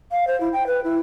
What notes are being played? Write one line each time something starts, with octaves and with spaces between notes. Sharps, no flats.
F5
C5
E4
G5
B4
E4